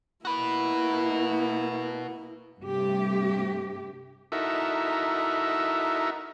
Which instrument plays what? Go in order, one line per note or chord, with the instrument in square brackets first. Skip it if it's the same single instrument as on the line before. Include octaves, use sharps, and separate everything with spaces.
[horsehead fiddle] A#3 E4 [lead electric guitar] F#4 B4
[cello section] G2 C3 A3 G4
[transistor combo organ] D#4 E4 F#4 A4 A#4 E5